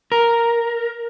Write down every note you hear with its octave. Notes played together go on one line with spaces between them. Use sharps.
A#4